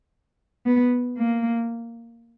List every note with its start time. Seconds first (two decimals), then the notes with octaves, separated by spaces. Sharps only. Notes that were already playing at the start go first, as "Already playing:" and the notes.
0.66 B3
1.17 A#3